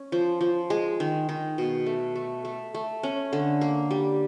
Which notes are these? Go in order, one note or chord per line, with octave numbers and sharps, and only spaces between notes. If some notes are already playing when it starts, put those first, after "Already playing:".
Already playing: C#4
F3
F3
G#3
D#3
D#3
B2
A3
A3
A3
A3
C#4
D3
A#3
G3